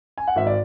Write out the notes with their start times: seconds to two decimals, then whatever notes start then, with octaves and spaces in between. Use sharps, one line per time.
0.18 G#5
0.27 F#5
0.36 G#1 E5
0.47 D5